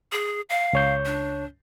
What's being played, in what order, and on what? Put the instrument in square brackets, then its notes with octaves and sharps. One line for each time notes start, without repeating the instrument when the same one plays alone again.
[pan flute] G#4
F5
[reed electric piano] C#2 C#5 G6
[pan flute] D4